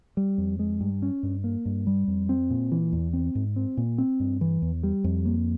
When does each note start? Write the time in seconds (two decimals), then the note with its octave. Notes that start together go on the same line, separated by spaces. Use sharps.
0.17 G3
0.38 F2
0.59 G#3
0.81 G2
1.02 C#4
1.23 G2
1.44 A#3
1.65 G2
1.87 G3
2.08 F2
2.29 C4
2.50 A#2
2.72 E3
2.93 E2
3.13 C4
3.35 G#2
3.56 C4
3.77 A#2
3.98 C4
4.20 G2
4.41 E3
4.62 E2
4.83 G3
5.04 F2
5.25 A#3